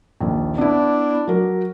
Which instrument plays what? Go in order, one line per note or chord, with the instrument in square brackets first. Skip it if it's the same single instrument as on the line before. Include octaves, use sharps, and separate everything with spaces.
[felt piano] A#1 D#2
[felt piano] B3 E4 [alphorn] D4
[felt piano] F#3 A#4